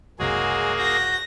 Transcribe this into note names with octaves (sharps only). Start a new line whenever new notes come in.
F#1 C2 F#3 G#3 A#3 F#4 G#4
F#4 G6 A#6